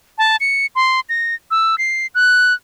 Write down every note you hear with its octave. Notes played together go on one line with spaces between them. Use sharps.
A5
C#7
C6
A#6
E6
C7
F#6